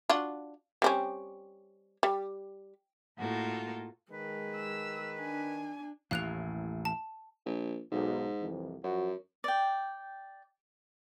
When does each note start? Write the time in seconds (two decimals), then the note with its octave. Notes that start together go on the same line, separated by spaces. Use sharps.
0.09 D4 F4 F#4
0.82 G3 C4 C#4
2.03 G3
3.18 A2 A#3 F4 F#4 A4
4.12 D#3 G#3 B4
4.56 E6
5.20 D4 G#5
6.11 A1 D#2 A2 F5 F#6 F7
6.85 A5
7.46 A#1
7.92 B1 G#2
8.41 C2 F2 E3
8.84 F#2 F3 F#4
9.44 D5 G5